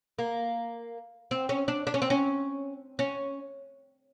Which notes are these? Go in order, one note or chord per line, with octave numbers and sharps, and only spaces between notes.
A#3
C4
C#4
D4
D4
C#4
C4
C#4
C#4